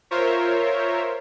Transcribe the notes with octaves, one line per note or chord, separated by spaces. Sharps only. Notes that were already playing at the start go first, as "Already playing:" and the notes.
F4 A#4 C5 C#5 E5